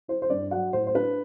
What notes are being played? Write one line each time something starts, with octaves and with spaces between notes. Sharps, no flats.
E4 C5
C5
G2 D5
F#3 F#5
A2 C5
C5
D4 B4